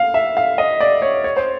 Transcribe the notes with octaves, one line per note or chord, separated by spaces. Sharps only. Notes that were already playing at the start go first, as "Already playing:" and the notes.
Already playing: F5
E5
F5
D#5
D5
C#5
C#5
C5